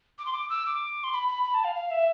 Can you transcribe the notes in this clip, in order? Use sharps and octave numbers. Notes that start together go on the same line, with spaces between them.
D6
C6
D6
E6
D6
C6
B5
B5
B5
A5
F5
F5
E5